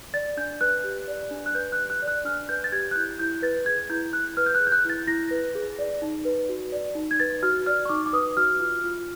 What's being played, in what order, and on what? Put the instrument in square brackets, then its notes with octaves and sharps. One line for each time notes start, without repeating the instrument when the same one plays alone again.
[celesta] D5 A6
D4 G6
B4 F#6
G4
D5
D4
F#6
B4 G6
F#6
G4
F#6
D5
F#6
D4 F6
B4 G6
A6
G4 G#6
F#6
E4 G6
E4 G6
B4 A6
G#4 G#6
E4 G6
E4 F#6
B4 F6
G6
F#6
G#4
G6
F#6
E4 A6
E4 A#6
B4
G#4
D5
D#4
B4
F#4
D5
D#4
G#6
B4 A6
F#4 F6
D5 F6
C#6
D#4 D6
D6
B4 D#6
F#4 F6
F4
F4